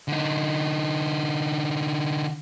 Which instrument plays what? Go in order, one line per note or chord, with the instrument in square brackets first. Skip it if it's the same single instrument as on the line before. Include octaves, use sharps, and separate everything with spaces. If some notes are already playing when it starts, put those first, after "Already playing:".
[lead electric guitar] D3 D#4